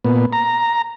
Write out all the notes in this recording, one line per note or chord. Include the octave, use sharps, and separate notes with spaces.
A#2 B3
A#5